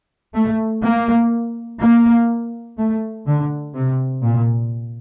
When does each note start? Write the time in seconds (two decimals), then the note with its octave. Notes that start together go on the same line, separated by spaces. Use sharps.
0.34 A3
0.83 A#3
1.80 A#3
2.77 A3
3.27 D3
3.75 C3
4.23 A#2